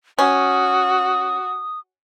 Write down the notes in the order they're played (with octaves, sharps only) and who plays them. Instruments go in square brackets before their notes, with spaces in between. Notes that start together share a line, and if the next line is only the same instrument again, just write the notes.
[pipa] C#4 [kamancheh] F#4 [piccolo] D#6